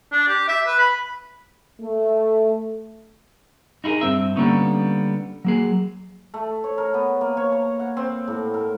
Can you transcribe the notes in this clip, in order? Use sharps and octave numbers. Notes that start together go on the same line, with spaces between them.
D4
G4
E5
B4
B5
A3
D#4 E4 F#4 G#4 A#4
G2 C4 E5
D3 G3 A#3 B3 C#4 D#4
F#3 A#3 G#4
A3
C#5
A#4
B3
A#3
C#5
A#5
F#5
C4
A2
A#4